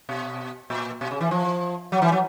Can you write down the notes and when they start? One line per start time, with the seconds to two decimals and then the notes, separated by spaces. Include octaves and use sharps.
0.09 B2
0.70 A#2
1.01 B2
1.11 C#3
1.21 E3
1.31 F3
1.92 F#3
2.02 E3
2.12 F#3